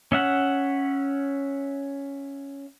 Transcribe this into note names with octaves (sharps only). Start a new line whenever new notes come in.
C#4 E5 F#5